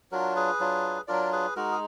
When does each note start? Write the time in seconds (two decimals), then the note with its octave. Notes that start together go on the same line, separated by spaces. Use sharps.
0.12 F#3 D4 F4 F#4 A#4
0.36 G#4 B4
0.60 F#3 D4 F4
1.08 F#3 D4 F4 A#4 D5
1.32 G#4 B4
1.56 G#3 D#4 F#4 A#4
1.72 G#4